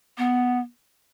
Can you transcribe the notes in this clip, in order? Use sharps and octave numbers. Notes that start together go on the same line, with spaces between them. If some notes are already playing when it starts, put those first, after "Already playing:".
B3